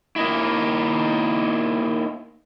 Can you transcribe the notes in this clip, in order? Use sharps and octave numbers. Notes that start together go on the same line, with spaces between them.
A#3 D#4 E4